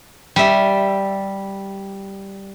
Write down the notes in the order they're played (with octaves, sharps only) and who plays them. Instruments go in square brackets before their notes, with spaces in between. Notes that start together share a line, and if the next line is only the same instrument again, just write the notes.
[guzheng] G3 E5